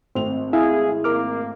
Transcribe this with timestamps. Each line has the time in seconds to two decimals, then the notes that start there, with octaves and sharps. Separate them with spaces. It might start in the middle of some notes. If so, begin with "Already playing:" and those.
0.15 G#1 A3 C4 F7
0.53 E4 G#4 E5 F5 G#5
1.04 A#3 A#4 D6 F6